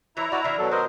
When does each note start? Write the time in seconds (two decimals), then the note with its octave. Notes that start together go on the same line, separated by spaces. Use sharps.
0.17 E3 E4 C#5 A#5
0.32 D#4 F#4 A4 B4 D5
0.44 D#3 D4 E5
0.58 B2 F#3 A4
0.71 D4 A#4 C5 D#5